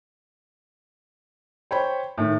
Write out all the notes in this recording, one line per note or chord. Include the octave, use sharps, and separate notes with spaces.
C5 C#5 G5 B5
A2 D#3